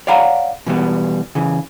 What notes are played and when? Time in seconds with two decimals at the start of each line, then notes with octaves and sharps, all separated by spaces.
0.07 C#5 D5 F5 F#5 A#5 B5
0.66 B2 E3 G3 B3
1.35 C#3 E3